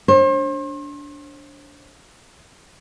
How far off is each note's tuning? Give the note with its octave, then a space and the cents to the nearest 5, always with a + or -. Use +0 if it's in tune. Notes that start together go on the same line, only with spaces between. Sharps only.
D4 -15 C5 +40